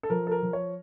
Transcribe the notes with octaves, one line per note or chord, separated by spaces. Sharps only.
A4
F3 A#4
A4
A#4
F3
C#5